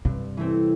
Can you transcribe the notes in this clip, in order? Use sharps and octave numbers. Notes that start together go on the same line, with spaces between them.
G2 C3
E3 A3 C4